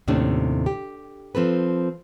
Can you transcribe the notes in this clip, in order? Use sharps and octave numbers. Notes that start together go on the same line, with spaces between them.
D#2 A2 C3 A3 C#4 D4
G4
F3 C4 A4 B4